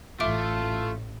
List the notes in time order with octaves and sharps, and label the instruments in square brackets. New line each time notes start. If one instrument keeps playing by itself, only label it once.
[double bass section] A1 [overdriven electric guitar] A3 [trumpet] F4 [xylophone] E5 D6 D7